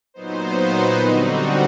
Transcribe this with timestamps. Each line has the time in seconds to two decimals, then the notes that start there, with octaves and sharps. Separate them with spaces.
0.14 A#2 F#3 B3 D#4 C5
0.55 B4
0.97 D3 G3 C4 D#4 F#4